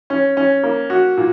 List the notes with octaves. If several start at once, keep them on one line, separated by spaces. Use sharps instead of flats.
C#4
C#4
A#3
F#4
A#2